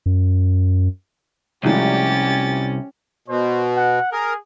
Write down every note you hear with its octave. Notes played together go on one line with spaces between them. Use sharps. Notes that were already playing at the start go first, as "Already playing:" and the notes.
F#2
C2 F3 G#3 A3 C#4 G4 A6
B2 C5
F#5
G#4 A#4